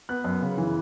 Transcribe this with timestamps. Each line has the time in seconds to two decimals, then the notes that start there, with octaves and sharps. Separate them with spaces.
0.09 B3 F#6
0.24 F#2
0.42 C#3
0.58 E3